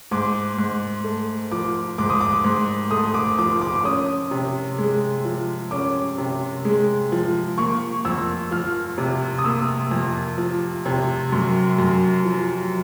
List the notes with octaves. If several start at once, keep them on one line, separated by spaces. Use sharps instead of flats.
G#2 D6
G#2
A3
F3 D6
G#2 D6
D#6
D6
G#2
A3 D#6
D6
F3 D6
D6
D6
C#4 D#6
C3
G#3
F3
C#4 D6
C3
G#3
F3
A#3 C#6
F2 E6
F3 F6
C3
D#6
A#3 E6
F2
F3
C3
F#2
F#2
F3